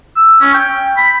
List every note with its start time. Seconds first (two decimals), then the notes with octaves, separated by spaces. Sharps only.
0.17 E6
0.41 C#4
0.55 G5
0.98 B5